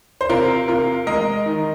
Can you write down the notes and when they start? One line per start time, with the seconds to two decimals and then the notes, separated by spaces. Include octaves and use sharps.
0.21 C5
0.29 C3 F4 A#4
0.68 C3 F4 A#4
1.07 G#3 A#4 D#5
1.46 D#3